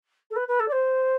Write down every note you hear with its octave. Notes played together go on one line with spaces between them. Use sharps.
A4
B4
B4
A4
D5
C5